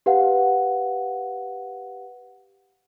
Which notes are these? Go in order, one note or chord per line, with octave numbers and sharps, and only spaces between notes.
G4 B4 F5 F#5